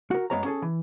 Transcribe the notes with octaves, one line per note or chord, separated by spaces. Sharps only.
F#4 A#4
F#2 G#3 B3 C#5 F5 A#5
C#4 G#4 A4
E3